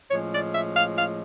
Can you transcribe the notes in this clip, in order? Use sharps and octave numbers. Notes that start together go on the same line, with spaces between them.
A2 F3 G#3 C#4 C#5
D5
E5
F5
F5